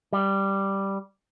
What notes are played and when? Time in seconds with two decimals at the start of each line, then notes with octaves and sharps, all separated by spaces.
0.13 G3